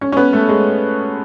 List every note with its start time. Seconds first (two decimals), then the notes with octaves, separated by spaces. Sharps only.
0.01 C#4
0.12 C#4
0.17 B3
0.33 A3
0.49 G#3